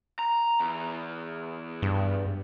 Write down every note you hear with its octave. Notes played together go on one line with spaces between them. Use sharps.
A#5
E2
G2